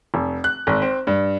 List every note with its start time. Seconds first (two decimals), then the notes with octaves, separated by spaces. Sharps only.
0.14 F1
0.44 F#6
0.67 G#1
0.82 C4
1.07 G2